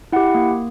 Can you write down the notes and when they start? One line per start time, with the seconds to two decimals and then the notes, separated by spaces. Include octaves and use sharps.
0.13 E4 F#5
0.16 G4
0.35 A#3